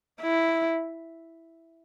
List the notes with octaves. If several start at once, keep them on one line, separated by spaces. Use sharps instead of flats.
E4